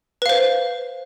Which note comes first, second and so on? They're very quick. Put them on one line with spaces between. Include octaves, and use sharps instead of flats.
B4 F5 C5